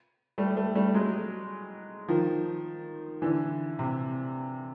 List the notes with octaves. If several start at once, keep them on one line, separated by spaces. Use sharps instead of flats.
G3 A3
G3 A3
G3 A3
F#3 G#3
D#3 F3
D3 E3
C3